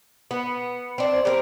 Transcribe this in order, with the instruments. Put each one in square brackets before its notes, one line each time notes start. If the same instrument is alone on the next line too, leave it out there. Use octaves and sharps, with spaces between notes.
[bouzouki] B3
C4 D4
G3 C4 A#4